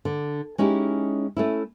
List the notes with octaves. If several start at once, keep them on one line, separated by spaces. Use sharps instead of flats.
D3
G#3 C#4 D#4 E4 G4
A3 C#4 E4